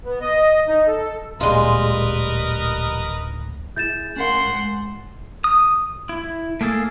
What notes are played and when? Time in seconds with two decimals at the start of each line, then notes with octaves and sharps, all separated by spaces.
0.05 B3
0.21 D#5
0.68 D#4
0.88 A4
1.41 D1 A#2 G3 G#3 F4 A#4 B4 D#5
3.76 E4 G#4 G6 A6 E7
4.16 C#4 A#4 F5 F#5 C6
4.45 G#2
5.44 D#6
6.09 E4
6.61 A3 A#3 G#4 A4